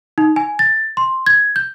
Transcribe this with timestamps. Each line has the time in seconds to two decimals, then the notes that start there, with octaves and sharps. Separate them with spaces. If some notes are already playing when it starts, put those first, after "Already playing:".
0.18 D#4
0.36 G#5
0.59 A6
0.97 C6
1.26 G#6
1.56 G6